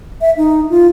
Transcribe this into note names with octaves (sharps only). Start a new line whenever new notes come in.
E5
D#4
F4